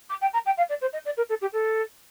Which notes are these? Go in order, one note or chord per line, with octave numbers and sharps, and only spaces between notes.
D6
G5
A#5
G5
F5
D5
C5
D#5
D5
A#4
A4
G4
A4